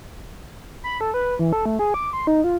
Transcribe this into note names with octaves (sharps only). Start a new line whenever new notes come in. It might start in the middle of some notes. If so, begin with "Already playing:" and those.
B5
A4
B4
E3
A4
A3
G#4
D6
C6
D#4
F4